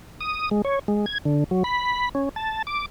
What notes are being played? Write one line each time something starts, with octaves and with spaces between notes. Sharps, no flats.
D#6
G#3
C#5
G#3
G#6
D3
F#3
B5
C#4
A5
D6